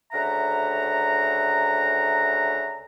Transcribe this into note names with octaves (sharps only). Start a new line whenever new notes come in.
D2 C#3 E5 F#5 A#5